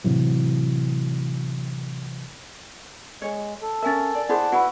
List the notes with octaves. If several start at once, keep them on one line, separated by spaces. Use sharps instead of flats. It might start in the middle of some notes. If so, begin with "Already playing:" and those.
A2 C3 E3 F#3
G#3 C#5
A4
C#4 A#4 E5 G#5 A6
D5
E4 G#4 C5 D5 F#5 A5
E4 F#4 B4 F#5 B5